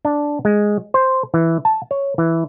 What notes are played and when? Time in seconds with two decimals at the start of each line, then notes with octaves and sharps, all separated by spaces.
0.05 D4
0.45 G#3
0.94 C5
1.34 E3
1.65 A5
1.91 C#5
2.18 E3